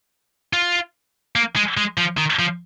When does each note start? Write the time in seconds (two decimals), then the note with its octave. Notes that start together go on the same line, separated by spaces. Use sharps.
0.53 F4
1.36 A#3
1.56 G#3
1.77 G#3
1.98 F3
2.17 D#3
2.39 F3